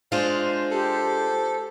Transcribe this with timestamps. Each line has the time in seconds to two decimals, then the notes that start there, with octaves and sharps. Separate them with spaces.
0.12 G#3 D4 F4 C5
0.71 G4 A4